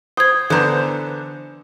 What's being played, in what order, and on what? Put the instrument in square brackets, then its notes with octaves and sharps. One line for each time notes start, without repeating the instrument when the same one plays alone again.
[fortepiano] C5 [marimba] D#6 G#6
[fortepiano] D3 B3 A#5 [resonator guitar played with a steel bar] E3 C5